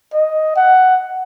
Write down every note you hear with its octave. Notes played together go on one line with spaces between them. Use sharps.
D#5
F#5